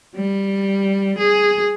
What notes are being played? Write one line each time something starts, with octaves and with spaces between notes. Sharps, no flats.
G3
G#4